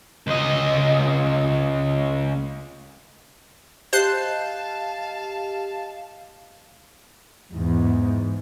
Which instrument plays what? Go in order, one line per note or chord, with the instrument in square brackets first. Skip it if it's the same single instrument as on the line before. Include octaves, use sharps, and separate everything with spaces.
[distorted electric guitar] C#2 D#5
[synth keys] G4 D#5 [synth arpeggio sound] C5 F#6 C7 [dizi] F5 [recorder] A5
[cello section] E2 [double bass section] G#2